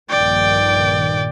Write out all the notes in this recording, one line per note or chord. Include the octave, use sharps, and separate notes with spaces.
A#1 G2 D#3 D5 G5